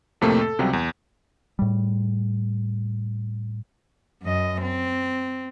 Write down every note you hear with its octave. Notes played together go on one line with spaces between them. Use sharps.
F2 A2 C3 A3 A#3
A4
C#2 C3 F#3 G3
E2
A2 G3
F#2 D#5
C4